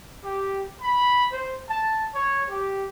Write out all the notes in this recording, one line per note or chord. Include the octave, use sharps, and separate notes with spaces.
G4
B5
C5
A5
C#5
G4